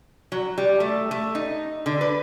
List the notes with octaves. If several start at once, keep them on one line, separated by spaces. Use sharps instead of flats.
F#3
G3
A3
A3
D#4
D3
B4